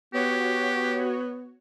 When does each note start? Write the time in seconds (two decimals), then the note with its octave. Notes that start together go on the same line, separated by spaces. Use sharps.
0.14 B3 F#4 G4 C#5